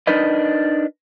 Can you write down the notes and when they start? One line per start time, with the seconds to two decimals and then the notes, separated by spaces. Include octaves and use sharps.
0.07 D4 D#4 A#4 B4 D#5